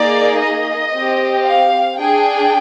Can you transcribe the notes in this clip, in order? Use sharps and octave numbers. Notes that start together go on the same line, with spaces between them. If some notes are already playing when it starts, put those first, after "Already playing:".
Already playing: A#3 D#4 G#4 D5
D#5
C4 G4
F5
D4 G#4 G5